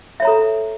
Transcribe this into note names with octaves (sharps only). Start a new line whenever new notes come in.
A4 C#5 E5 A#5